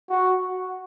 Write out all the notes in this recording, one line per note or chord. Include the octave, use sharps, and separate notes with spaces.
F#4